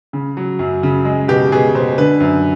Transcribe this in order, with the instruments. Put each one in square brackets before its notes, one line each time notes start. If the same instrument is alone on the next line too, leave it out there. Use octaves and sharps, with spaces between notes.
[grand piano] C#3
F#3
F#2
C#3
G#3
B2 G4
B2 G#4
B2 C5
D3 B4
F#2